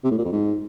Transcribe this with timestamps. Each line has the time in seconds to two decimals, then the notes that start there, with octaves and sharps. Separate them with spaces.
0.04 C3
0.11 A2
0.18 A#2
0.25 F2
0.32 G#2